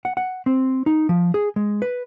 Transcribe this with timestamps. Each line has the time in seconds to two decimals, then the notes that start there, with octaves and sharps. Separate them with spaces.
0.05 F#5
0.17 F#5
0.46 C4
0.86 D#4
1.09 F3
1.34 G#4
1.56 G#3
1.82 B4